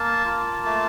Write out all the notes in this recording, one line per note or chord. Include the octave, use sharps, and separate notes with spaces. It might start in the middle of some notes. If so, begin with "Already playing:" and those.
Already playing: A#3 A5
F4
A3